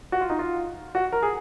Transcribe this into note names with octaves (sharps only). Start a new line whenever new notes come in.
F#4
F4
D#4
F4
F#4
A#4
G#4